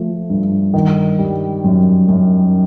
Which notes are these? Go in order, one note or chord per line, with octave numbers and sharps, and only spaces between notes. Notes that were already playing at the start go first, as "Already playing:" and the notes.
Already playing: F3 A3
G2
D#3
G3
F#2
F#2